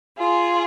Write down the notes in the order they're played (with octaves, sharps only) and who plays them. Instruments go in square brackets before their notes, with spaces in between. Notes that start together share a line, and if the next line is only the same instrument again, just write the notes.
[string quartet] F4 G#4